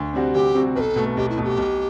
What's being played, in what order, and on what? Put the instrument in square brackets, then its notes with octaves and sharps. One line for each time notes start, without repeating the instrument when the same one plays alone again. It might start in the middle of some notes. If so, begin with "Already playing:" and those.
Already playing: [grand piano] D2
C3 G3 C4 F#4
[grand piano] D2 [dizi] G4
[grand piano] C3 G3 C4 F#4
[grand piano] B1 [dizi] A4 B4
[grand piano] B2 A3
[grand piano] B1 [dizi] G4
[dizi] E4
[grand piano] B2 A3
[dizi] G4
[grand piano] B1